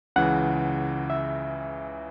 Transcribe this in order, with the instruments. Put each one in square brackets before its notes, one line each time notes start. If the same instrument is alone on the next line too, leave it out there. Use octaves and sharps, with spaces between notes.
[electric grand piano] C#2 C#3 E3 [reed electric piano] F#5
[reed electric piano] E5